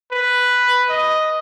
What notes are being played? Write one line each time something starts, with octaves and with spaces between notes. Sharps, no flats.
B4
D#5